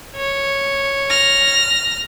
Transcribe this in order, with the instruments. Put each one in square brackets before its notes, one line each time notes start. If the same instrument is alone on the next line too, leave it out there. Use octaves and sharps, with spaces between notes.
[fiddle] C#5
[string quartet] F6 A#6